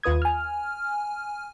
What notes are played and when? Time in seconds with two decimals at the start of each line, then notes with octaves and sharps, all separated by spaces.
0.03 D#2 F4 B4 D#6 G#6
0.22 G#5 F6